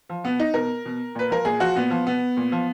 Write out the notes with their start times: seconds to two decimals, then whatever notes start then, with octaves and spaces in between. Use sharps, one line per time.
0.09 F3
0.24 B2 B3
0.39 D#4
0.54 B2 A#4
0.85 B2
1.15 A#2 B4
1.30 F3 A#4
1.45 A#2 G#4
1.60 F3 F#4
1.76 A#2 B3
1.90 F3
2.06 B2 B3
2.37 A#2
2.52 F3